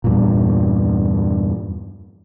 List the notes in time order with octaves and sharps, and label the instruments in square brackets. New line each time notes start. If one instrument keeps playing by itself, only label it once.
[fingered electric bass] E2 G2 A#2